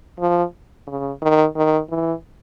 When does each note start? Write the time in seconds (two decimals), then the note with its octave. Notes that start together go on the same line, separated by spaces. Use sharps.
0.19 F3
0.87 C#3
1.22 D#3
1.56 D#3
1.89 E3